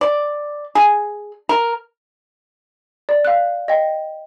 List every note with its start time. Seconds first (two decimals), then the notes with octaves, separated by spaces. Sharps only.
0.01 D5
0.75 G#4
1.49 A#4
3.09 D5
3.25 F5 F#6
3.68 D#5 G5